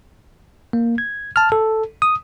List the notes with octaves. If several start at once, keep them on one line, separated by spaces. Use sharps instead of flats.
A#3
G#6
A5 F6
A4
D#6